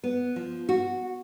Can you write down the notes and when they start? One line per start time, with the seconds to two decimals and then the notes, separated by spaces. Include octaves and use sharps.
0.04 B3
0.36 F3
0.69 F#4